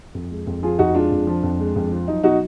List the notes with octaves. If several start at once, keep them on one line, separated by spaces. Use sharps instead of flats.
F2
G#3
F2
F3 F4 G#4
F2 D#4 F#4
G#3 D4 F4
F2
F3
F2
G#3
F2
F3
F#3 D#4
B2 D#4 F#4